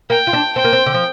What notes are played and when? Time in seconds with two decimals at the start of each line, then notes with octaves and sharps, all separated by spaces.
0.10 A#3 G5
0.27 F4
0.33 D4
0.56 C4 G5
0.64 A#3
0.73 C4
0.86 D3
0.94 F3